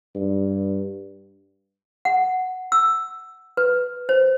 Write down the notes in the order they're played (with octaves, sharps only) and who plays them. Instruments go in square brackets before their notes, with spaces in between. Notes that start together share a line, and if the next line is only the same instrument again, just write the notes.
[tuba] G2
[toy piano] F#5
E6
B4
C5